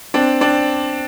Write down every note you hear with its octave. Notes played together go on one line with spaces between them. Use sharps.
C4 D4
C4 D4